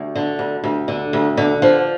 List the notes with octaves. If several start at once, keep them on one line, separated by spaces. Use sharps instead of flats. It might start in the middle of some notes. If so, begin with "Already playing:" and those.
Already playing: D2
D3
D2
D2
D3
D2
D3
F3